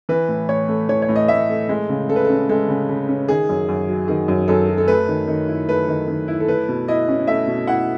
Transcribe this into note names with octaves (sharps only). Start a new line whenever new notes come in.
E3 B4
A2
A2 C#5
A3
E3 C#5
C#5
A2
D#5
A2 E5
A3
G#3
C#3
C#3 A4
B4
C#4 A4
G#3 A4
C#3
C#3
C#4
D#3 G#4
F#2
F#2
F#3
D#3 G#4
F#2
F#2 A4
F#3
A4
A3 B4
D#3
D#3
E4
A3 B4
D#3
D#3
E4
A4
A3 B4
B2
E4 D#5
C#4
A3 E5
B2
E4 F#5